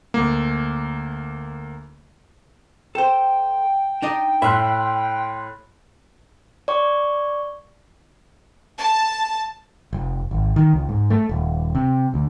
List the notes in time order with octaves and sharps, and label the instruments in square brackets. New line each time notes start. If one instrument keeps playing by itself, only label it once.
[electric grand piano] D2 A#3
[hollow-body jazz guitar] A4 C5 [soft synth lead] G5
[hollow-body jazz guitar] D4 D#4 D#5
[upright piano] A2 F6 [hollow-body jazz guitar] E5 [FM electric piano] B5 C6 F#6
[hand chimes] D5 C#6
[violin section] A5
[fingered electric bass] F1
G#1
D#3
C#2
G#2
A3
D#1
C3
D2